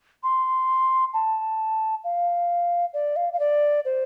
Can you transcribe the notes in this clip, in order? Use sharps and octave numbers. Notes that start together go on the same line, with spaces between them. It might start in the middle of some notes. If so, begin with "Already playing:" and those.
C6
A5
F5
D5
F5
F5
D5
C5